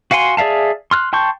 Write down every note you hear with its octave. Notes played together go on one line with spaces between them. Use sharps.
F#4 F5 F#5 G#5 C6
G#4 D5 E5 F5 A5
C6 F6 F#6
G5 A5 C6 C#6 G6